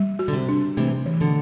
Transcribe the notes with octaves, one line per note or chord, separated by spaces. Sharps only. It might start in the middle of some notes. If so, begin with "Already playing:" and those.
Already playing: G3
F#4
D3
C3
D4
C3 E3 A3
E3
B2 D3